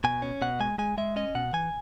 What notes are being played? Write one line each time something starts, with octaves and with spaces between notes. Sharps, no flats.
B2 G#5
C#4
B2 F#5
G#3 G#5
G#3 G#5
G#3 E5
C#4 D#5
B2 F#5
E3 G#5